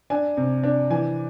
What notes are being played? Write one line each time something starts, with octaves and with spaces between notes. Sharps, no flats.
D4 G#5
C3
D4
E3 G#5